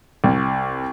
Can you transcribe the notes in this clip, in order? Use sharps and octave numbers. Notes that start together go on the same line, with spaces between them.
C2